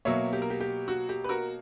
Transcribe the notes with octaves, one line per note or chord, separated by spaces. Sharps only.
B2 F#3 A#3 C#5 E5
G4
A#4
G4
G4
F#4
G4
B4
F#4 A#4